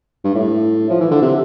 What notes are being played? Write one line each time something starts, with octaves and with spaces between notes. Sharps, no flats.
G2
A2
F3
E3
D3
C3